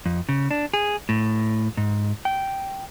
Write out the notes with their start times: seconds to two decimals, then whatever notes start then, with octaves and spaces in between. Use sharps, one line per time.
0.06 F2
0.29 C#3
0.51 D4
0.73 G#4
1.09 A2
1.77 G#2
2.25 G5